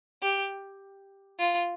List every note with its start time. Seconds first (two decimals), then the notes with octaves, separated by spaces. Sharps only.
0.22 G4
1.39 F4